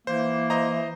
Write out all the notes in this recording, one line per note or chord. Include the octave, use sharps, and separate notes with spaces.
E3 A#3 C5
C5 D#5 A#5